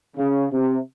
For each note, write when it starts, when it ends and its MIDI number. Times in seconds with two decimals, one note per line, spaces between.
0.17 0.45 49
0.52 0.77 48